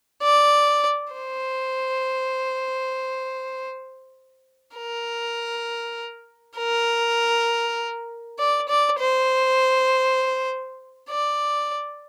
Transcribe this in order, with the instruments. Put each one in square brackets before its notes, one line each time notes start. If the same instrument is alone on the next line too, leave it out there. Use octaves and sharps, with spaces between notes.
[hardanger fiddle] D5
C5
A#4
A#4
D5
D5
C5
D5